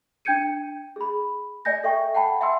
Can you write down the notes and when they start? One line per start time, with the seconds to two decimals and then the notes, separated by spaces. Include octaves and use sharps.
0.25 D4 G5 G6 G#6 C#7 D#7
0.96 G#4 B5
1.65 D5 D#5 G#5 G6 A#6
1.84 A4 E5 G5 C#6
2.15 F#5 G5 A5 B5
2.41 E5 F#5 G#5 C6 E6